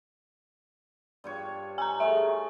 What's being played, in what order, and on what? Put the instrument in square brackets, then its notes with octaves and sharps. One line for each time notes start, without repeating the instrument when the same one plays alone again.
[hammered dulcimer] G2 F4 C#5
[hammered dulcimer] D#4 C#6 [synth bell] G#5 A#5
[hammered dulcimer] A3 G#4 A#4 [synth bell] E5